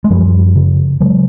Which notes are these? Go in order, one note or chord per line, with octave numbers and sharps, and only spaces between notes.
G#3
F#2 F3 G3
C#3
C#3 F#3 G#3